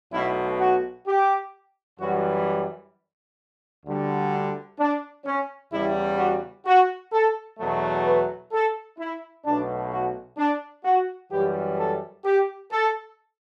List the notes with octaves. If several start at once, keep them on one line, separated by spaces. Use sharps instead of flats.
B1 B2 A3 E4
F#4
G4
F#2 E3 G3 F#4
D2 D3 G3
D4
C#4
E2 C#3 G3 E4
F#4
F#4
A4
E2 B2 F#3 A3 A4
B4
A4
E4
B1 B2 A3 D4
F#4
D4
F#4
F#2 E3 G3 G4
A4
G4
A4